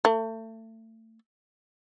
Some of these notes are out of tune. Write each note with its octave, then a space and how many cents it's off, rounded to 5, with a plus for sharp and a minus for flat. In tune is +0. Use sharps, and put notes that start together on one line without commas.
A3 +30